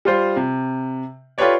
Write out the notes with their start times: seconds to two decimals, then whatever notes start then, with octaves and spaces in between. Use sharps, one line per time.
0.05 G3 F4 C5
0.36 C3
1.38 F4 G4 A4 B4 C#5 D5